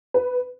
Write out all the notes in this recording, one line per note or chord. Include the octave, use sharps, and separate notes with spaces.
B4